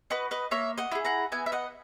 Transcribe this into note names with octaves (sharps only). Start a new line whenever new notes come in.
F#4 B4 D#5
B4 D#5
A#3 C#5 E5
D#5 F#5
E4 G#4
F#5 A#5
B3 E5 G#5
E5
D#5 F#5